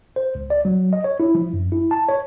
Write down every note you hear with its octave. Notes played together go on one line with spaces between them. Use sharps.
C5
C#2
D5
F#3
D#5
C#5
E4
F3
F#2
E4
A5
C#5